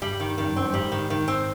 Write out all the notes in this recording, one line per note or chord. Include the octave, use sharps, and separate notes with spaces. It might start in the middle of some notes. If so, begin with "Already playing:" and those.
G2 G3
D#3
F#2 D#3
G2
F#2 C4
G2
G#2 G3
D#3
D#3
C4